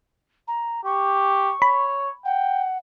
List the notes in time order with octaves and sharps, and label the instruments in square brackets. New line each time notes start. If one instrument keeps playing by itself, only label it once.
[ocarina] A#5
[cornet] G4 [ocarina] C#6
[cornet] C#5 [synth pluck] B5
[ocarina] F#5 [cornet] G5